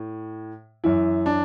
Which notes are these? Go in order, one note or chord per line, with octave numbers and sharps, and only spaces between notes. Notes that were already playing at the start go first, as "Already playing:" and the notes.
Already playing: A2
F#2 E3 E4
D4